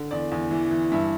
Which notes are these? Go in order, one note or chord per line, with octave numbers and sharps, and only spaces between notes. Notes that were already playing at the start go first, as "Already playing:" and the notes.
Already playing: D3
E2 D5
E2
E3
E3
G2 E5